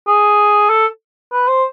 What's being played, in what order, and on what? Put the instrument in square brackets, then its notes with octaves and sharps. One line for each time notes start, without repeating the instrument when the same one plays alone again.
[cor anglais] G#4
A4
B4
C5